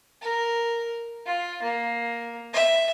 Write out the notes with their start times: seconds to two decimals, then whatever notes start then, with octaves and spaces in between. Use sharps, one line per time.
0.21 A#4
1.25 F4
1.62 A#3
2.53 E5